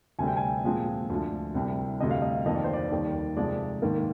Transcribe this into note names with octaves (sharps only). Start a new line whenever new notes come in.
D2 C3 G3 C4 G#5
G5
G#5
A#2 F3 G#3 C4
D2 D3 F3
C2 C3 G3 C4
D2 C3 G3 D#5
F5
D#5
F2 D#3 A#3 D#5
D5
C5
D5
D#2 D#3 G3 A#3
F2 C3 F3 G#3 D5
G#2 D#3 A#3